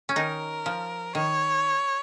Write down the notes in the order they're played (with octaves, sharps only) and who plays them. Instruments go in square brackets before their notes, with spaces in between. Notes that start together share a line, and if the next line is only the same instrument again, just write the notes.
[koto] C#4
[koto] D#3 D#4 [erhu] A#4
[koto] F3
[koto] D#3 [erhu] C#5